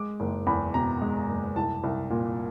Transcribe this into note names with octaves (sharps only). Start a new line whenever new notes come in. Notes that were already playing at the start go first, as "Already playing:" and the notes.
Already playing: G#3 D6
F#1
E2 B5
B2 A#5
G#3
F#1
C2 A5
C2
A#2